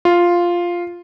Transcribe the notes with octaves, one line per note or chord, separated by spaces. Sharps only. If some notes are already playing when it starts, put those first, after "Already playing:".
F4